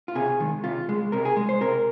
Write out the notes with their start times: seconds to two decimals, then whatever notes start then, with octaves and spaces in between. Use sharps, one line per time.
0.08 F4
0.15 C3 G#4
0.40 D#3 G#3
0.64 C3 F4
0.89 G#3
1.12 C3 A#4
1.25 G#4
1.37 G#3
1.49 C5
1.61 C3 A#4